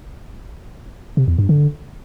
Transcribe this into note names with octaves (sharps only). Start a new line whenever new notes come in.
C3
E2
G2
D3